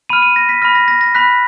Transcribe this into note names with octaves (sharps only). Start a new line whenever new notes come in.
B5 F6 D#7
D#7
A#6
B6
B5 F6 A#6
A#6
A#6
A#6
B5 F#6 B6